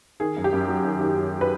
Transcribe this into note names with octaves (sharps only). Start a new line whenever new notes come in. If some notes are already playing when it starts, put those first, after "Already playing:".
D#3 G#4
F#2
G4
F#2
F#3
D#3
D#3
F#3
B4